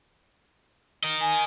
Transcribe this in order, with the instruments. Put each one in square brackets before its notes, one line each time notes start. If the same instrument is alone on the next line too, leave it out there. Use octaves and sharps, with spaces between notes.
[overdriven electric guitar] A#4 D#5
[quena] G#5